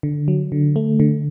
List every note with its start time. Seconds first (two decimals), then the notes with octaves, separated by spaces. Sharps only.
0.03 D3
0.28 F#3
0.52 D3
0.76 A3
1.00 D3